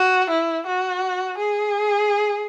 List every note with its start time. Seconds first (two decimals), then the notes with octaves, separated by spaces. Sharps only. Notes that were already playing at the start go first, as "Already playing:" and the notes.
Already playing: F#4
0.30 E4
0.67 F#4
1.38 G#4